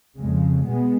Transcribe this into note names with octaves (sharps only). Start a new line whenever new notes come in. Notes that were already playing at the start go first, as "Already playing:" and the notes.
F2 C#3 G#3
B2 G#3 B3